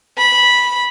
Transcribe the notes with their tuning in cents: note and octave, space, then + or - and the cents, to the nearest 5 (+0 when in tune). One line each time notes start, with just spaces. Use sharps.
B5 -10